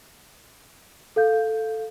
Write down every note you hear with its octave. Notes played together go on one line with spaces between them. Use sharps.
A4 F5 G6